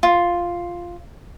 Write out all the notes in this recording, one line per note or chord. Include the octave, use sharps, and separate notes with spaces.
F4